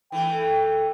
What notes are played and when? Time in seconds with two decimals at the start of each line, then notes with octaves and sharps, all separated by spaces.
0.12 E3 A3 G5